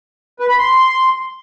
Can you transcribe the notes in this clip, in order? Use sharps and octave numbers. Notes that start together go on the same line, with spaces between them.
B4
B5
C6